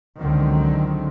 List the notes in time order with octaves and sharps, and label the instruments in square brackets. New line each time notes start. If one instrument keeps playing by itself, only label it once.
[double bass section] C#2 D3 D#3 F#3 C4